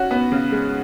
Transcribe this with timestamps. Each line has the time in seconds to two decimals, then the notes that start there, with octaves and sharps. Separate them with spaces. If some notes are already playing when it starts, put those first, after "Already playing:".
Already playing: C#4 F#4
0.11 B3
0.32 C#3
0.52 G#3